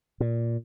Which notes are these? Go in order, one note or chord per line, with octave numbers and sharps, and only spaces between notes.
A#2